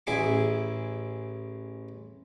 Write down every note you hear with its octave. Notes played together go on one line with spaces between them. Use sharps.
A1 E4 G#4 D6